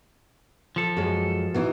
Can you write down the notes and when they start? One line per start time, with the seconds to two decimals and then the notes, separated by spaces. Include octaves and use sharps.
0.76 F3 A4
0.97 F#2 G#3
1.54 B2 E3 D#4